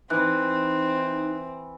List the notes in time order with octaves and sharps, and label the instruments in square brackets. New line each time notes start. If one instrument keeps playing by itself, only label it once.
[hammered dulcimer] E3 [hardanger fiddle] C4 [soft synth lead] D#4 [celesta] F#6